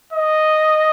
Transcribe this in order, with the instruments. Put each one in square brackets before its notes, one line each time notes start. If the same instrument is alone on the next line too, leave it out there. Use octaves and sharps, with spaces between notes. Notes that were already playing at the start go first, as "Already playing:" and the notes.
[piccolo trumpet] D#5